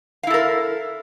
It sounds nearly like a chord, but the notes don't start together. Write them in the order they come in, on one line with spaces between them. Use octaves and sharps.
F5 E4 A4 A#4